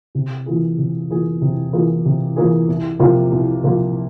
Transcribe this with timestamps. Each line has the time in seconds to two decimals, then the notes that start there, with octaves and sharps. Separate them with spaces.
0.15 C3
0.46 E3 A#3 F4 G#4
0.78 C3
1.09 E3 A#3 F4 G#4
1.41 C3
1.73 E3 A#3 F4 G#4
2.05 C3
2.36 E3 A#3 F4 G#4
2.68 C2
2.99 C3 F3 A#3 F4
3.32 C2
3.63 C3 F3 A#3 F4